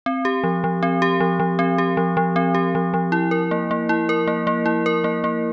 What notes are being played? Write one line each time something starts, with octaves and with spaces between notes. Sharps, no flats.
C4
G4
F3
F3
C4
G4
F3
F3
C4
G4
F3
F3
C4
G4
F3
F3
E4
A#4
A#3
A#3
E4
A#4
A#3
A#3
E4
A#4
A#3
A#3